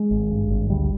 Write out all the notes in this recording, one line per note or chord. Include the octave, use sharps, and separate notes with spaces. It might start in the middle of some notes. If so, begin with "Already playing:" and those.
Already playing: G#3
G#1
G2
G#1
D2 G3